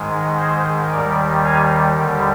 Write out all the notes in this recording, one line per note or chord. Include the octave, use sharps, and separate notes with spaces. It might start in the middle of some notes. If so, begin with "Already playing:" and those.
Already playing: G#2 D#3 G#3
G#4 C5
D#2 D#3 G3 A#4 D5
F5 G#5
D#2 D3 G3